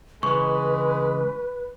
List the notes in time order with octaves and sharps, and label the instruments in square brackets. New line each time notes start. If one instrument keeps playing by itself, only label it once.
[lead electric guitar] C#2 E3 [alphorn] G#3 [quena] B4 [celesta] C#6